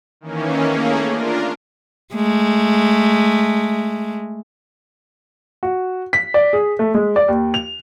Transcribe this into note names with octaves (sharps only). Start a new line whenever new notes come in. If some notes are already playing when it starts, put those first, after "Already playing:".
D#3 E3 A#3 C#4
A3 A#3 C#4 G#4
D4 F4 A#4
G#3 A3
F#4
B6
D5
G#4
A3
G#3
D5
D#2
F7